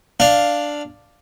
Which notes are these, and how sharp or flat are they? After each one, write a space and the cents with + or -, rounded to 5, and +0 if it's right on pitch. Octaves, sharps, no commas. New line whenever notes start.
D4 +0 F5 +0